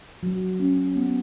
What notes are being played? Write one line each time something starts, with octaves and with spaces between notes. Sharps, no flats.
F#3
C#4
B3